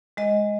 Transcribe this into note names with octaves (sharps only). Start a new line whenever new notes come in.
G#3 D#5